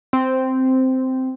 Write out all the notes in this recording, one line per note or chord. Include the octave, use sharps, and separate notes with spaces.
C4